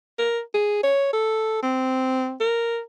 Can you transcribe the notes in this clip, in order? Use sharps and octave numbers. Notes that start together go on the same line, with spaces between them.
A#4
G#4
C#5
A4
C4
A#4